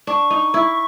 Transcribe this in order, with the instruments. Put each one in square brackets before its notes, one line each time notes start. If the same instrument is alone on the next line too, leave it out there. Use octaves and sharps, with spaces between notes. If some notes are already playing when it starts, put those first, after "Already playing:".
[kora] D4 [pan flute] C#6
[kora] D#4
E4